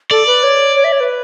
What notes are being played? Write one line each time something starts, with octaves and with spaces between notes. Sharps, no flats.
A4 D5
B4
C#5
C#5
E5
C#5
B4